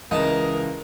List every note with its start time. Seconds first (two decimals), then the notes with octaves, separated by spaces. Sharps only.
0.11 C#2 E3 D#4 A#4 A5